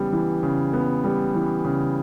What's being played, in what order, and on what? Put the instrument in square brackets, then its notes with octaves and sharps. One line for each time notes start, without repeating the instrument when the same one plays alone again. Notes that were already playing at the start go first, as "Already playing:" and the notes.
Already playing: [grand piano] C#3 E3 G3 B3
E3
C#3
B3
G3
E3
C#3